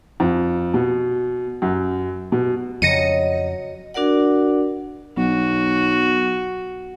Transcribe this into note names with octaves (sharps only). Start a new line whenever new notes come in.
F2
B2
F#2
B2
F2 C#3 F#3 D#5 A#6 C#7 D#7
D4 F#4 A#4 D5 F#5
B1 F#4